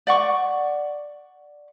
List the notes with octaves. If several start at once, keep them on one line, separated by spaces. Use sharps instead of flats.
D5 F#5 C#6 D6